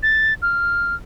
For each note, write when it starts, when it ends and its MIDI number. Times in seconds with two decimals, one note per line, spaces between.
0.03 0.34 93
0.42 0.95 89